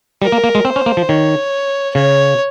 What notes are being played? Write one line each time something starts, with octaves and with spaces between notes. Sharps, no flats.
G3 A#4
A#3
A#3
G#3
C4 C5
C#4
A#3
F3
D#3 C#5
C#3 C#5